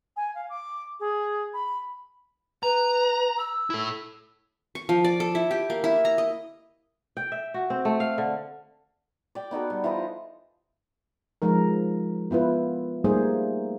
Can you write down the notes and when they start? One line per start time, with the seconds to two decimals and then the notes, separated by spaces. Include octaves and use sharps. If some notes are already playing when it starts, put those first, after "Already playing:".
0.17 G#5
0.35 F5
0.50 D6
1.00 G#4
1.54 B5
2.63 B4 A#5
3.38 E6
3.70 E4 A4
4.75 C#6
4.89 F3
5.04 D5
5.20 A4
5.35 E4
5.51 G4
5.70 A#3
5.84 E4
6.05 A#5
6.18 D#5
7.17 G5
7.32 E5
7.54 F#4
7.70 C4
7.85 A3
8.00 F5
8.18 D3
9.35 D5 G5
9.51 B3 D#4 F#4 A4
9.70 G3
9.84 E3 F4 C5 D#5
11.42 F3 G#3 D#4 A#4
12.31 B3 E4 F4 B4
13.04 G3 A3 A#3 D#4 G#4 C5